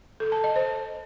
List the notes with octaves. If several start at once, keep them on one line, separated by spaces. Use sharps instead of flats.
A4
A5
D#5
C5